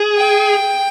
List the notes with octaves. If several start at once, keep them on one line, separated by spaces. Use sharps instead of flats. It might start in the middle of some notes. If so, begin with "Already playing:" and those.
Already playing: G#4
G5